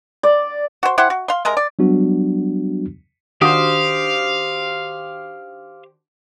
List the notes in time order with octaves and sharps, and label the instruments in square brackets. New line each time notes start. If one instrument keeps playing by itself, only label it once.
[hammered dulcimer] D5
[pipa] F#4 C5
E4 G4 C5 F#5
F#4
F5 C6
C3 G#3 A#4
D5
[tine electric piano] F#3 G3 B3 D4 F#4
[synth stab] D#3 D4 F#4 [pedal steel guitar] G4 C5 [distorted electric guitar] F5 [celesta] D#6